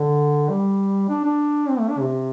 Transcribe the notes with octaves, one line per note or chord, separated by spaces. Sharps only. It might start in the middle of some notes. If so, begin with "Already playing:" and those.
Already playing: D3
G3
D4
D4
C4
A3
D4
C3